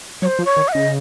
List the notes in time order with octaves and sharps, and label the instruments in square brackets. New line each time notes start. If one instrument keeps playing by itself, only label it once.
[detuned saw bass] F#3 [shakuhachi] C#5
[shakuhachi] C5
[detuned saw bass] F3
[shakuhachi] C#5
[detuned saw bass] D#3
[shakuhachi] F#5
[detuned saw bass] C#3 [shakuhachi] D#5